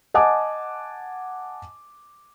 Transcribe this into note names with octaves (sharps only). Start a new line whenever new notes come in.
D#5 F#5 G#5 A5 D6